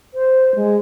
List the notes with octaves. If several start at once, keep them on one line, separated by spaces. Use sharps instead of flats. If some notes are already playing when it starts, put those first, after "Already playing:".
C5
G#3